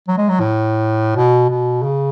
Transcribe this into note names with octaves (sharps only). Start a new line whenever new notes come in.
F#3
G#3
F#3
A2
B2
B2
C#3